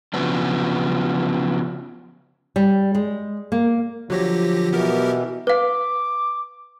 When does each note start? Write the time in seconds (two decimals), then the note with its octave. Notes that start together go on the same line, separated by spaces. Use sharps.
0.14 C#3 F3 F#3 B3 D4
2.56 G3
2.95 G#3
3.52 A#3
4.10 D3 F3 F#3 G4 C#5 A#6
4.73 B2 E3 B3 G4 A#4
5.47 B4 F5 D6